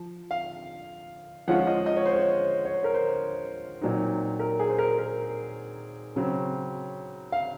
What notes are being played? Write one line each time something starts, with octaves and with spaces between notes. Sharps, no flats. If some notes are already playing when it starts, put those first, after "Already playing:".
Already playing: F3
F5
F3 G#3 C#4 F4 F#5
D#5
D#5
C#5
C5
C#5
C#5
C5
A#4
C5
A#2 F#3 C4 D#4
A#4
G#4
C5
A#4
A#4
C#3 F#3 C4
F5